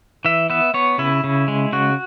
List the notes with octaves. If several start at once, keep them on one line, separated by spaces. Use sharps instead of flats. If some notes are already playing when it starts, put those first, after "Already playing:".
E3 E5
B3 E5
B3 C#5
C#3 E4
C#3
G#3
C#3 F#4